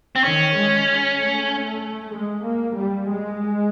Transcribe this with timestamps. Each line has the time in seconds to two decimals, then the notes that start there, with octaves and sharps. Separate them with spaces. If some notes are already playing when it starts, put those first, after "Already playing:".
0.16 C4
0.24 D#3 C#4
0.57 G#3
1.18 A3
2.13 G#3
2.44 A#3
2.75 G3
3.08 G#3